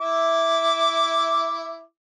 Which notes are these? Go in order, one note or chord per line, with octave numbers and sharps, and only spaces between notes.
E4 E5 D6